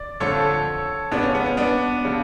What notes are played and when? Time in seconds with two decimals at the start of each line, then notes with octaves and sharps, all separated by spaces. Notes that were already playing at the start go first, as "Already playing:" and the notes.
Already playing: D5
0.20 F2 D3 F3 A4 C#5
1.11 F2 C#3 F3 B3 D4
1.23 C#4
1.35 B3
1.46 C#4
1.57 B3 D4
2.05 C#3 F3